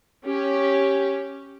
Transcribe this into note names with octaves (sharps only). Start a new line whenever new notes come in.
C#4 G4